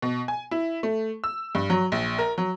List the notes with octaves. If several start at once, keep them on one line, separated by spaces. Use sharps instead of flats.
B2
G#5
E4
A3
E6
G2
F#3
A#1
A#4
F#3